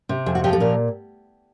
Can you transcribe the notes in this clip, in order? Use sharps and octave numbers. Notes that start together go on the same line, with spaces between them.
C3
F2 G#4
F#4
F3 G4
A4
A#2 A#4